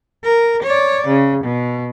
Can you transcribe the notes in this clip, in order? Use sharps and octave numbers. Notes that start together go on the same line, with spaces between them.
A#4
C#5 D5
C#3
B2